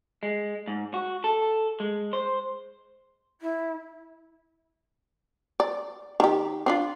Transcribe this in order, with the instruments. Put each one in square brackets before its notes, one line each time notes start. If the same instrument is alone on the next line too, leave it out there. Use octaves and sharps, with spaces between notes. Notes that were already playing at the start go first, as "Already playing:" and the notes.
[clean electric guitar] G#3
G#2
F#4
A4
G#3
C5
[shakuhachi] E4
[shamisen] D5
D#3 G4
C4 D4 F4